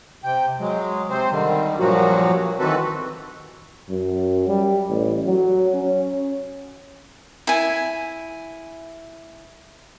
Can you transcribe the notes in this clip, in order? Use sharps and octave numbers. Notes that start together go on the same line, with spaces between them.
C3 G5
F#3 G#3
C3 C4 C5
D3 D#3 G3
G2 A#2 F3 F#3 A#3 F#4
D#3 E3 C4 F#4 A4 B4
F#2
G3
A1
F#3
C#4
E4 G#5